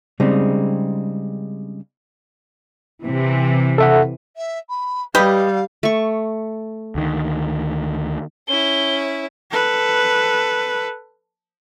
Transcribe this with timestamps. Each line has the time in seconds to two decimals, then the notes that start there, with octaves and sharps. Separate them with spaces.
0.20 C#3 G3 G#3 C4 D#4
3.03 C3 E3
3.78 A4 E5 F#5
4.36 E5
4.69 B5
5.15 G3 G4 B4 D#5 F5
5.83 A3 C#6
6.95 D2 D#3
8.48 C#4 E4 G7
9.51 A4 B4